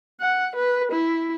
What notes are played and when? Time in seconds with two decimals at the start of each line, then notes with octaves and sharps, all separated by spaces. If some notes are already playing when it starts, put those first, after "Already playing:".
0.20 F#5
0.56 B4
0.92 E4